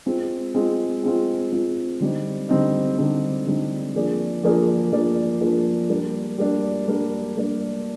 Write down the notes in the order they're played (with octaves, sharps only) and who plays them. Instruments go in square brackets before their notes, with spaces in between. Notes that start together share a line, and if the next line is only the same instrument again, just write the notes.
[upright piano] G#3 C4 F4
G#3 C4 F4
G#3 C4 F4
G#3 C4 F4
D3 G3 C4 D#4
D3 G3 C4 D#4
D3 G3 C4 D#4
D3 G3 C4 D#4
F3 A#3 D4 G#4 D5
F3 A#3 D4 G#4 D5
F3 A#3 D4 G#4 D5
F3 A#3 D4 G#4 D5
G3 A#3 D4
G3 A#3 D4
G3 A#3 D4
G3 A#3 D4